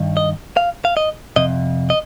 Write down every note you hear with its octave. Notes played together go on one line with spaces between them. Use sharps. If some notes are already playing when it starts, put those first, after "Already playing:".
Already playing: G2 D#3
D#5
F5
F5
D#5
F2 C3 D#5
D#5